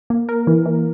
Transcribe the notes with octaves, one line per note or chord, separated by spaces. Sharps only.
A#3
A#4
E3
E3